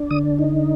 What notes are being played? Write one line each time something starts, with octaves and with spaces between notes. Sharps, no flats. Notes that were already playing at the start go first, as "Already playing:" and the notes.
Already playing: D4
D3 D#6
D#4